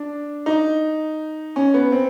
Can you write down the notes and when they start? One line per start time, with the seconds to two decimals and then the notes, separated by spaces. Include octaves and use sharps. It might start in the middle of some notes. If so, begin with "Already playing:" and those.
Already playing: D4
0.46 D#4
1.56 C#4
1.74 B3
1.92 C4